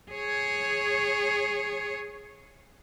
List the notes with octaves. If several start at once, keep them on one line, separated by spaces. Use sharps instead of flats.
G#4 C#5